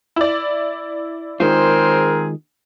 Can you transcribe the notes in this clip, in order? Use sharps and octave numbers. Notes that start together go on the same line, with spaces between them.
E4 D5
D#3 G#3 C4 F4 G#4 A#4 C5